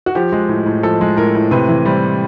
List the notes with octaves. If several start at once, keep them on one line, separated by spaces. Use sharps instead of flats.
F#4
F3 G4
G#3
A2
A2
F3 A4
G#3
A2 A#4
A2
C3 B4
E3
G3 C5